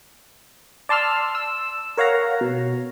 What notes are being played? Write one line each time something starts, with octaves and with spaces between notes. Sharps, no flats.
D5 A5 C6 E6 F6
E6
A#4 C#5 F5 F#5 A#5
B2